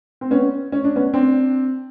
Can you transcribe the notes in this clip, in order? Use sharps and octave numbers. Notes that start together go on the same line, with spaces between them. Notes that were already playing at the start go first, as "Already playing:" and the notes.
C4
B3 C#4
C#4
D4
B3 C#4
C4 D4